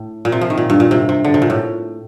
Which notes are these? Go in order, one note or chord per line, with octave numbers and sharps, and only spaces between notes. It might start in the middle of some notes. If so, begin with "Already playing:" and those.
Already playing: A2
A#2
C3
F3
D#3
A#2
G2
A#2
C3
C3
D3
C3
A#2
A2